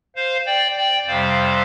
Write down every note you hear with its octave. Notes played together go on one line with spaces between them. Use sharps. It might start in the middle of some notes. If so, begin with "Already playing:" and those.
C5 F5
D5 G5
D5 G5
F2 C3 G3 C5 F5